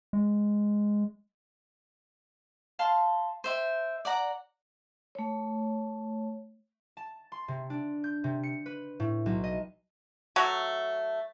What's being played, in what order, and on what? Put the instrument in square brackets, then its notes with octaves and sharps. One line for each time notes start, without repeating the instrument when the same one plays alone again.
[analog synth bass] G#3
[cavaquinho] F5 A5 C6
C5 E5 G5
D5 F#5 A#5
[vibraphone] A3 C#5
[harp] A5
C6
C3
D4
G6
C3
C#7
B4
A2
B1
D#5
[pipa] F#3 A3 F#4 C#5